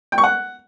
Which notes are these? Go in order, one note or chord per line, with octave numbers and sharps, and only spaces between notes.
G5
C#6
F#5